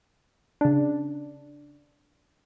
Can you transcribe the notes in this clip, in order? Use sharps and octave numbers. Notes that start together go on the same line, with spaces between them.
C#3 D4